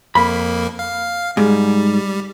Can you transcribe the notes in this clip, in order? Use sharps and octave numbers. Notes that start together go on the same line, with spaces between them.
F2 A#3 B5
F5
G#2 G3